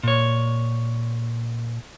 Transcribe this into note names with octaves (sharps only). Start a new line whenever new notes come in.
A#2 C#5